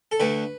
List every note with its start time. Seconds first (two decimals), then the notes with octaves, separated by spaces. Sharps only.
0.12 A4
0.20 D2 D3 B4